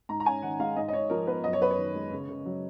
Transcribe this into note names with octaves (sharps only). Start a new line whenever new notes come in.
G#2 A#5
A#5
C#4 G#5
D#3 F#5
G#3 F5
G#2 D#5
D#5
G#2 C#5
F3 A#4
B3 B4
F#2 D#5
C#5
F#2 B4
C#5
D#3
G#3
C#3
C#3
F#3